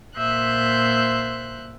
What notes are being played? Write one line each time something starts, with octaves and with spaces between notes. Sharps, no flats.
A#2 C5 E5 F#6 G6